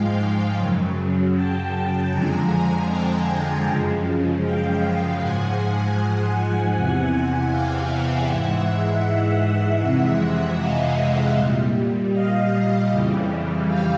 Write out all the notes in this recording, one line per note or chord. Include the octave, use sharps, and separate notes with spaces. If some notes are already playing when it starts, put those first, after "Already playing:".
Already playing: G#2 F3 G#3 F5 G5
F#2 C#3 F#3
G5 A5
F2 D3 F3 G#3 G#5 A#5
G5 A5
F#2 C#3 F3 G#3
F5 G5
G#2 F3 G#3 F#5 G#5
E2 C3 E3 F#5 G#5
F5 G5
E5 F#5
G#2 E3 G#3
F2 C3 E3 G#3 E5 F#5
D#5 F5
A#2 G3
D#5 F5
F2 C#3 E3 G3
F5 G5